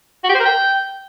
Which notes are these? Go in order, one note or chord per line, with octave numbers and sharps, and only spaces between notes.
F#4
G4
C5
A#4
G5